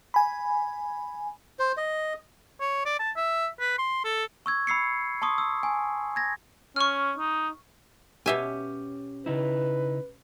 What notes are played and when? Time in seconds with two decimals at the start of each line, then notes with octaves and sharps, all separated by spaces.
0.14 G#5 B5
1.59 C5
1.77 D#5
2.61 C#5
2.86 D5
3.00 A5
3.16 E5
3.60 B4
3.78 C6
4.04 A4
4.46 C#6 E6 G#6
4.67 B5 E6 C7 C#7
5.22 A5 C6 C#6 D#6
5.38 E6
5.63 G#5
6.16 G#6 A#6
6.76 C#4 C#6 F6
7.18 D#4
8.26 B2 C#4 G4 E5 G#5
9.26 C#3 D#4 E4 B4